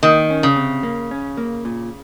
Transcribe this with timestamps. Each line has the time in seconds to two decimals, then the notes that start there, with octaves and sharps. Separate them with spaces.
0.03 D#3 A#3
0.30 C#4
0.43 C#3
0.56 C3
0.83 A#3
1.11 C#4
1.37 A#3
1.65 A#2